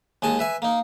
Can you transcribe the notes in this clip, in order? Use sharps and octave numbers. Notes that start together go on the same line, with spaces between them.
D#2 G#3 G#5 A5
B4 E5 G#5
A#3 D#4